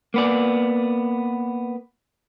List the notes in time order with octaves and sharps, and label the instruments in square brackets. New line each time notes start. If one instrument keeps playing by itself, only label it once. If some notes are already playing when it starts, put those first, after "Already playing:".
[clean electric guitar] A#3 B3 D5